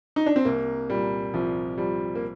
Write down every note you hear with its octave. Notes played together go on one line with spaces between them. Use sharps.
D#4
D4
C4
C2 A#3
A#2 G3
C2 F3
F3 G3
A#3